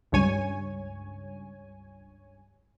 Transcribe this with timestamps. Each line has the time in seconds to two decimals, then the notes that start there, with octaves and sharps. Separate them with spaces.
0.12 C#2 G2 C#5 G#5